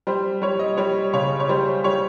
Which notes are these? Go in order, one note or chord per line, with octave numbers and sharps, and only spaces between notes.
G3 C5
G3 C#5
D#5
G3 C#5
C#3 C#5
C#5
G3 C5
G3 C#5